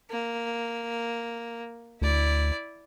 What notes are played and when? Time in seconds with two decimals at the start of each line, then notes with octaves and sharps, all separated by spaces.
0.10 A#3
2.02 D2 E4 D5